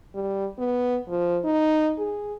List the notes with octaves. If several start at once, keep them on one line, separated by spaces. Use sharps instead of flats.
G3
B3
F3
D#4
G#4